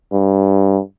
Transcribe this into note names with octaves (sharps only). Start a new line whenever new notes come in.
G2